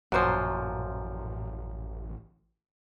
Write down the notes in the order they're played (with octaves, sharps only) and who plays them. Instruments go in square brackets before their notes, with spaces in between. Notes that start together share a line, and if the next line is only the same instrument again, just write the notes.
[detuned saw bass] A1 [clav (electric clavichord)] F#2 A#2 F3 [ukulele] F#4 C5